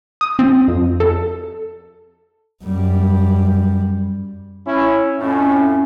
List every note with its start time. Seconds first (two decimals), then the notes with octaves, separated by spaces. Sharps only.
0.21 D#6
0.39 C4
0.68 F2
1.00 A4
2.64 F#2 G3
4.67 C#4 E4
5.20 F2 A2 C#4